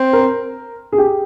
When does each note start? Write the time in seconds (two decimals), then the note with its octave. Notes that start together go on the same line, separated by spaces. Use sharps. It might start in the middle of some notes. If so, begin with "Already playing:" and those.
Already playing: C4
0.13 A#4
0.92 G#4
0.98 G4